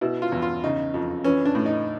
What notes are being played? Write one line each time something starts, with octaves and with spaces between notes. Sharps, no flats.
B2 E4
F4
E2
F4
C#3 D#4
F2
E3 C#4
D4
A2
D#4